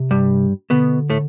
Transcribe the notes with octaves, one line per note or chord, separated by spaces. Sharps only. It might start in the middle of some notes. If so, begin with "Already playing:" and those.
Already playing: C3
G2 G3
B2 D3 B3
A2 A3